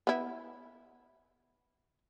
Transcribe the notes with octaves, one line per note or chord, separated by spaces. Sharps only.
B3 E4